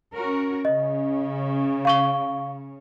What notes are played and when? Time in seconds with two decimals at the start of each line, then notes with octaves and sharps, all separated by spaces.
0.13 C#4 F#4 A#4
0.65 C#3 C#4 D#5
1.85 F5 C#6 G7